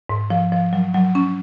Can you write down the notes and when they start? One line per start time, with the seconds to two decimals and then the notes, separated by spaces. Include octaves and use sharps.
0.09 G#2
0.30 F3
0.52 F3
0.73 F#3
0.94 F#3
1.15 C#4